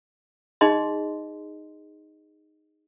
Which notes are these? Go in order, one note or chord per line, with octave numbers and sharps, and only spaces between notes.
D#4 G#4 D#5 C6